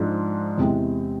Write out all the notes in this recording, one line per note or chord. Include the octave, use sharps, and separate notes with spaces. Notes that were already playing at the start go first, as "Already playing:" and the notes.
Already playing: G#2 F3 G#3 D4
E2 C3 G#3 C4